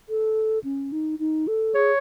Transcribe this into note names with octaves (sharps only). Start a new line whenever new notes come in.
A4
C#4
D#4
D#4
A4
G#4 C#5